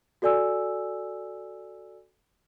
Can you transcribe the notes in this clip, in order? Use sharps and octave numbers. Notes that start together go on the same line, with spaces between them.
F#4 A4 D5 G#5 E6